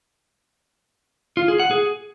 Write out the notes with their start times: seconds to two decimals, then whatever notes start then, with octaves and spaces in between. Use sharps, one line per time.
1.37 F4
1.48 G#4
1.59 F#5
1.71 G#4